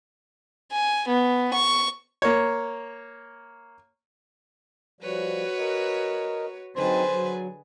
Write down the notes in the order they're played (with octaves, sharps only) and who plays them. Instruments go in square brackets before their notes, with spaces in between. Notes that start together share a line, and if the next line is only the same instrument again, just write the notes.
[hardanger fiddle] G#5
B3
C#6
[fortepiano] A#3 C#5
[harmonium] F3 G3 [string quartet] F#4 B4 C#5
[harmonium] A#4 D#5
[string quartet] D3 G#4 B4 [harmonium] F#3 C4 D#4 [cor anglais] C5
[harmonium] F#3